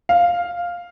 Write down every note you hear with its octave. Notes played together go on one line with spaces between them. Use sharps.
F5